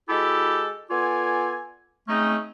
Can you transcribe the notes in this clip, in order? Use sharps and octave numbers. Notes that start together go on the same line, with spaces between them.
G#3 E4 F#4 G4 A4
B3 F4 A4 D5 G#5
G#3 A3 C4 C#4 D#4